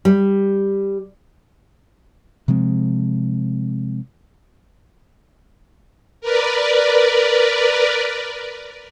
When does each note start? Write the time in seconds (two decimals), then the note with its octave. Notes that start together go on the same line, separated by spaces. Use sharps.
0.05 G3
2.48 C3 F3 G#3 C4
6.21 A#4 B4 D5